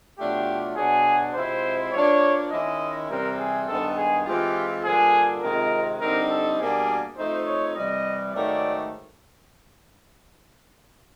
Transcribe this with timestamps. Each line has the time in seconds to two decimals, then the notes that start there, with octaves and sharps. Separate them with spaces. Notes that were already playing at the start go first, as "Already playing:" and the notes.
0.18 B2 F#3 A3 D4 F4 G4
0.76 B2 F#3 B3 D4 G#4
1.34 C3 F3 G#3 C4 E4 C5
1.93 F3 A#3 D4 C#5
2.51 D#3 G#3 C#4 E4 D#5
3.09 C3 E3 G3 C4 A#4
3.38 G#4
3.67 G2 D#3 G#3 B3 A4
3.97 G#4
4.25 E3 G#3 C4 F4 G4
4.84 G2 D3 F3 A#3 D4 G#4
5.42 C3 D#3 G#3 C4 F4 A#4
6.01 D3 G3 C4 D#4 A#4
6.30 A4
6.59 B2 G3 A#3 D4 F#4 G#4
7.17 F3 A3 C4 D#4 C5
7.46 C#5
7.75 C3 E3 G3 D#5
8.34 G#2 D#3 F#3 A3 D5